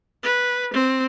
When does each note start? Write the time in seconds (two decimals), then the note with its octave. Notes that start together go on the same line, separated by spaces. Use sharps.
0.23 B4
0.73 C4